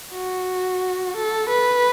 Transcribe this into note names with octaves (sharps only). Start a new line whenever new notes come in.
F#4
A4
B4